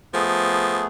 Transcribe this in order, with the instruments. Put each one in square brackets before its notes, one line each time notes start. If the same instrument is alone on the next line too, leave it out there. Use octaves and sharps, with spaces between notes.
[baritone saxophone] F3 [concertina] A3 B3 G#4